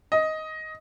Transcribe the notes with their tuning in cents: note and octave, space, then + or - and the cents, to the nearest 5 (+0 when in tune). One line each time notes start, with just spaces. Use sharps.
D#5 +10